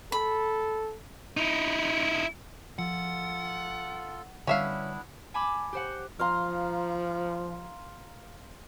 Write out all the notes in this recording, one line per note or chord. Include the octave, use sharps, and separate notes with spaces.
A4 B5
D#4 E4
F3 F4 A4 F#5
D3 G3 B3 C#4 D4 E4 E5 F5
G#5 A5 B5 D6
G4 C5 F#5
F3 F5 A#5 C6